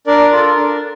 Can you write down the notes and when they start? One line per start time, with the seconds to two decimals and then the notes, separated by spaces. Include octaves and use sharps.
0.07 D4 A#4 D5
0.32 F4 A4
0.57 D4